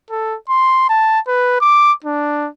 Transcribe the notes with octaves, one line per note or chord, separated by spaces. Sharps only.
A4
C6
A5
B4
D6
D4